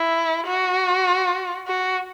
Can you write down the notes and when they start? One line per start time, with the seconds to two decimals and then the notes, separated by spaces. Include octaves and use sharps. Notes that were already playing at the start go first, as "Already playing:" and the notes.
Already playing: E4
0.46 F#4
1.67 F#4